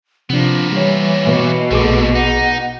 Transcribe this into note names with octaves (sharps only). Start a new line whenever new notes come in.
C3 F3 A#3 B3 D4
E3 G3 C#5
B2
A#1 D3 A3 B3 G#4 D6
D#4 F#5